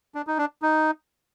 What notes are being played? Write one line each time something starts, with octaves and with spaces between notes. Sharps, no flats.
D4
D#4
D4
D#4